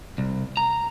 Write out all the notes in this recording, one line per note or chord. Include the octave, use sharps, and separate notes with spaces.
C2
A#5